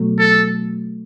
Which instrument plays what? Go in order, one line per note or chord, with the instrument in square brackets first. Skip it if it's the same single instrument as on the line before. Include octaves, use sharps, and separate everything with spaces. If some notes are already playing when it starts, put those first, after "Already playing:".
Already playing: [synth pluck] B2 F#3 A3
[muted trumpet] A4